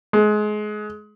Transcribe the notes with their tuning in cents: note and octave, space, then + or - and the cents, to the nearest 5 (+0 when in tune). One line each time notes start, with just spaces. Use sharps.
G#3 +25